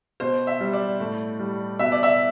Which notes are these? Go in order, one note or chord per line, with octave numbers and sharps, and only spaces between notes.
B2 C5
E5
G3
D5
A2
G3
B2 E5
D5
E5